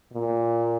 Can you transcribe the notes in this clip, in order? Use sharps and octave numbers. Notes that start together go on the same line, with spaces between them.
A#2